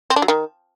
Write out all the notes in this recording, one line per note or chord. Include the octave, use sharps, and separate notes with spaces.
C4
D4
F#3
D#3